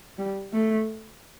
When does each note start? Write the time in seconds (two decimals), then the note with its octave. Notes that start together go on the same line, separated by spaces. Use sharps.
0.18 G3
0.53 A3